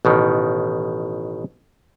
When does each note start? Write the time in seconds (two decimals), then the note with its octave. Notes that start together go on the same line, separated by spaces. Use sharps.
0.05 A1 B2 D#3